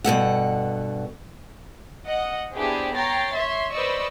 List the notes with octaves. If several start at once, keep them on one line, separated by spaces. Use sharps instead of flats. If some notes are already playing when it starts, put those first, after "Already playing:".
G2 B2 A4 F#5
D#5 F#5
B3 D4 E4 G4 G#4 C5
C#5 G5 A#5 A6 C7
C#5 E5 C6
B4 C5 D5 D#5 C#6 E6